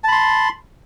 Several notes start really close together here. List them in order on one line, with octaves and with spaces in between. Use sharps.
A5 B5 C6